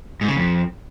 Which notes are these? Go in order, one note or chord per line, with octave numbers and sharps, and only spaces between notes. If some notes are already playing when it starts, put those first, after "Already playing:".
G#2
C#3
F2